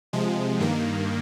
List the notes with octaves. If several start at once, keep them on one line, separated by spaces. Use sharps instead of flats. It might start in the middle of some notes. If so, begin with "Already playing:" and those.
C3 F3 G#3
G2 D#3 A#3